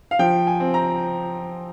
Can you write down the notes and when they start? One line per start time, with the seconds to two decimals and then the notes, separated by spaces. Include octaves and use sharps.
0.11 F5
0.19 F3 G5
0.47 G#5
0.60 C4
0.74 A#5